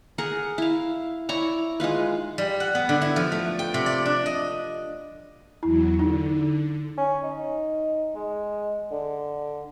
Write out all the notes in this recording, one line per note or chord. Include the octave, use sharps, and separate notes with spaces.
G#4 A#4 F#5
E4 F5
E4 C#5 D5 A#5
G#3 D#4 F4 B4
G3
F#5
B3
D3
E4
F3
A3
G5
C3
D5
D4
D#5
E2 F#3 E4
D3 D#4
C#4
D#4
G#3
D3